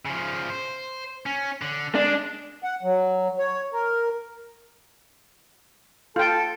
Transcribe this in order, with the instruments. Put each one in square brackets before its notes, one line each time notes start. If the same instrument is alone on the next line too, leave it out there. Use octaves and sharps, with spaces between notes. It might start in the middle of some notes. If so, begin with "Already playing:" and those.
[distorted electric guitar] C#3 F3
C5
C#4
D3
[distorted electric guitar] G#3 [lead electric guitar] D4
[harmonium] F#5
F#3
C#5
A#4
[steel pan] F4 G5 [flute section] A4 A5